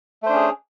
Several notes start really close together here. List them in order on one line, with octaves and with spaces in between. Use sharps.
A3 C5 D4 C#4 G#4